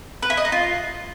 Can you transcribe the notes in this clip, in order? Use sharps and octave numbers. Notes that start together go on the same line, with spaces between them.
B4
E4
D#5
D#4
F4